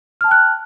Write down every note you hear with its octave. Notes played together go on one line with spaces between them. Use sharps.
G5 A5 F6 F#6